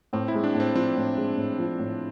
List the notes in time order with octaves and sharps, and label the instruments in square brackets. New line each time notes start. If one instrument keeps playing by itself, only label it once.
[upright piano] A2 [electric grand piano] C4
[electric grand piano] E4
[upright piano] G#3
[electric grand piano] D4
[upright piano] A2
[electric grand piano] C4
[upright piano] F3 [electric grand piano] C4
[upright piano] A2
G#3
A2
F3
A2